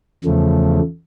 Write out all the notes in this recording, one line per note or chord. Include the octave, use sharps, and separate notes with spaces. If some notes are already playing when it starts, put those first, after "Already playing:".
E2 C#3 F3 A3